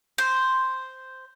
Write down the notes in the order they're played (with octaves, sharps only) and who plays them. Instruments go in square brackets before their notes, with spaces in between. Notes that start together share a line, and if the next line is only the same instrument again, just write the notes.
[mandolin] C5